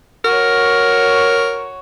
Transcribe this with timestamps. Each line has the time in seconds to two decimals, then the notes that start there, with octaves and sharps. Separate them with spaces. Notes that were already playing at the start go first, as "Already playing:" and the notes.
0.25 F#4 A#4 C#5